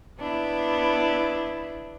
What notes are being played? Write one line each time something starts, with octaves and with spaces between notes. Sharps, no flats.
B3 D4 E4